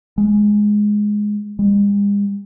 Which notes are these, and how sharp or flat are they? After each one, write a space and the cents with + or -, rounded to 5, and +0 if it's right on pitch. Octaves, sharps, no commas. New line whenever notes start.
G#3 +5
G#3 -45